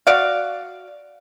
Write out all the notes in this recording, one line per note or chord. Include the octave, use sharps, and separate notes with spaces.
F#4 D5 F5